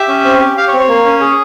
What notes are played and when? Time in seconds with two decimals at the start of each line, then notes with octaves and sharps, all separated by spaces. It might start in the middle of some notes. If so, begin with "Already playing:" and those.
Already playing: G4 E5
0.08 C#4
0.24 C4
0.40 G4
0.57 G4 F5
0.68 C#5
0.73 C4
0.79 C#5
0.88 A#3
1.05 C#4
1.21 G#4